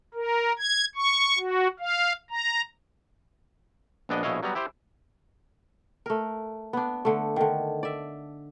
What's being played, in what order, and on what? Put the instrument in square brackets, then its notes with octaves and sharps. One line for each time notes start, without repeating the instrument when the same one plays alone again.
[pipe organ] A#4
G#6
C#6
F#4
F5
A#5
[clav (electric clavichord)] A#1 B3 D4 D#5
A#1 B2 E4 C#5 D#5 F5
F#3 G3 B3 A#5
E4 G4 C5
[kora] A3 A#4
B3 D4
D3 A3
D3 D#3
D5 E5